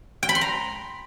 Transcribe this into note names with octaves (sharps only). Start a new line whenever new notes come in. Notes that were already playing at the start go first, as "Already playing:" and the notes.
G5
B5
C6
A#5